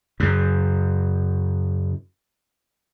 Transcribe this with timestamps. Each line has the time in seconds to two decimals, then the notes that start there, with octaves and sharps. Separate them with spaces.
0.20 F#2 C#3